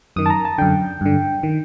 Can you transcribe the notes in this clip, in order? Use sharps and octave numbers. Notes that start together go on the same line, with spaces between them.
F#2 D#3 D#6
A5
A#5
A5
F#2 D3 G5
G2 D3
D#3